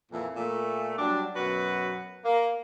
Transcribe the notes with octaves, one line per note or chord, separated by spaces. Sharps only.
F2 A#2 E3
A#2 A3
F#3 G3 D4
F#2 B2 F#3 F#4 B4
A#3